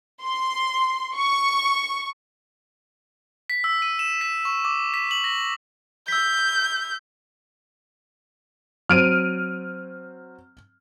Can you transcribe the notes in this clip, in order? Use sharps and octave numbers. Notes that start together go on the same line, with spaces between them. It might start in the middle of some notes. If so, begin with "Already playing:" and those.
C6
C#6
B6
E6
D#7
E7
B6
C#6
D6
B6
F#7
A#6
E6 G6 B6
F#3 C4 F6 D7 D#7